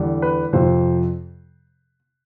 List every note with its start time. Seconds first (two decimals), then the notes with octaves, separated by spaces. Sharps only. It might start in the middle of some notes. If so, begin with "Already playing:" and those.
Already playing: E2 D3 G3
0.22 B4
0.53 F2 C3 F3 C5